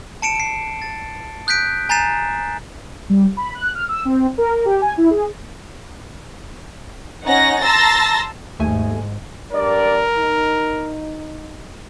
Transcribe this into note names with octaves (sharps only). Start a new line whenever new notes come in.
A5 C#7 D7 E7
C7 D7
A6
D#6 F#6 G6 B6 D7
G#5 A#5 G6 A6 C7 E7
G3
B5
F#6
F6
E6
C4
A#4
G4
G#5
E4
G#4
C#4 D#4 C#5 F#5 A#6
A5 A#5 C6 E6 A6 A#6
D#2 G#2 A3 G#5
G2 A#4 D5
D#4